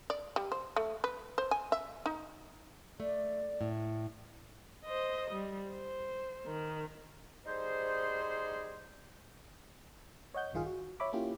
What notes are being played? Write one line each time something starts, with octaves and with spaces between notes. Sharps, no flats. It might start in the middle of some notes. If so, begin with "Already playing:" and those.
D5
G3
C5
A3
B4
C5
G#5
E5
D#4
A3 D5
A2
C5 D#5
G3
C5
D#3
G3 D#4 G#4 C5
C#5 D#5 F#5 G6
A#1 G2 D#3 F4 G#4 F5
F#4
C#5 E5 B5 D6
A#3 C#4 E4 F4 G4